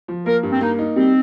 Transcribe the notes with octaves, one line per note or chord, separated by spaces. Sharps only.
F3
A#3 A#4
G2
C4
A#3 D#4
D#4
G3 C4